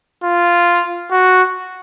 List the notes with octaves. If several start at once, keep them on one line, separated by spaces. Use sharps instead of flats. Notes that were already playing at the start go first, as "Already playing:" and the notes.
F4
F#4